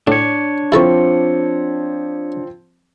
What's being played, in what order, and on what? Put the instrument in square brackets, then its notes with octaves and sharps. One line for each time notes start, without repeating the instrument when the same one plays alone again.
[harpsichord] A2 [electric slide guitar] D4 C#5
[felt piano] F3 C4 [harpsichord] E4 A4 C#6